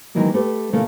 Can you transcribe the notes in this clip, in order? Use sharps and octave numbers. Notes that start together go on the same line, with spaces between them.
D#3 E3 F#3 G#3 A#3
A3 G4 A4 B4
A#2 C#3 E3 A3 A#3